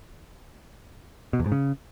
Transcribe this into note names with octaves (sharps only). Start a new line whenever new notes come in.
B2
E2
G#2
C#3